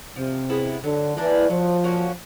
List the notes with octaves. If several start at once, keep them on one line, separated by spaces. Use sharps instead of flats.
C3 F3
G#3 B3 E4
D3 F#3
E3 A#3 D4
F3 F#3
A#3 C#4 F#4